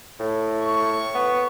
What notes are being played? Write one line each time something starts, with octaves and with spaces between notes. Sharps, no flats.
A2
C#6
B3